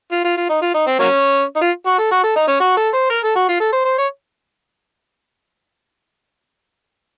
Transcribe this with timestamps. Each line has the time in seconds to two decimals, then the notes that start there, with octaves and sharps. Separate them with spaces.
0.12 F4
0.25 F4
0.37 F4
0.50 D#4
0.62 F4
0.74 D#4
0.87 C4
0.99 F#3 A#3 C#4
1.56 D#4
1.61 F4
1.87 F#4
1.99 A4
2.12 F#4
2.24 A4
2.36 D#4
2.48 C#4
2.60 F#4
2.77 A4
2.94 C5
3.10 A#4
3.24 A4
3.36 F#4
3.49 F4
3.60 A4
3.73 C5
3.85 C5
3.98 C#5